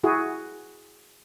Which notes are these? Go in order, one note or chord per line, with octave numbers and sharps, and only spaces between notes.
E4 F#4 G#4